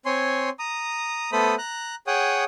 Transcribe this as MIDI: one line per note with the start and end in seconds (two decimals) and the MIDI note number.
0.06 0.49 60
0.06 0.49 73
0.06 0.49 80
0.06 0.49 84
0.59 1.30 82
0.59 1.30 87
1.32 1.55 57
1.32 1.55 59
1.32 1.55 69
1.32 1.55 72
1.32 1.55 83
1.32 1.55 87
1.58 1.95 82
1.58 1.95 90
2.07 2.44 68
2.07 2.44 73
2.07 2.44 78
2.07 2.44 79
2.07 2.44 87